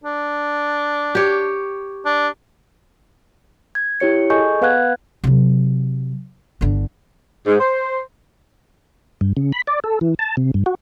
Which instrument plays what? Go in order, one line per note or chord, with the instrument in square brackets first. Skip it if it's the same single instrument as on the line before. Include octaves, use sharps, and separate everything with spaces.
[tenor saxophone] D4
[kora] G4 C#5
[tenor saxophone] D4
[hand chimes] G#6
E4 G4 C#5 C#7
G#4 A4 D#5 G#5 C#6 G6
B3 B4 F5 F#5 F#6 G#6
[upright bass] C3 F#3
G1 D3
[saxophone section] G#2
C5
[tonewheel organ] G2
C#3
B5
D5
A4
E3
A5
C3
G2
F#4